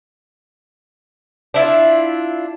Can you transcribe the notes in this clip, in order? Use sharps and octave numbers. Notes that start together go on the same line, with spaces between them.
D4 E4 F4